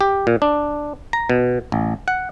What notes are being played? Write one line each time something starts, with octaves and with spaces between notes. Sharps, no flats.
G4
A#2
D4
A#5
B2
A1
F#5